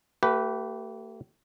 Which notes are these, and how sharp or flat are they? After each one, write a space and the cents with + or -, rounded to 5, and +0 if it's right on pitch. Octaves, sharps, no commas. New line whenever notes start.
A3 +35 G4 -30 B4 +0